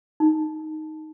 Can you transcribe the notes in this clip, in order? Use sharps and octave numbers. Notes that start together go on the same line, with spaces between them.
D#4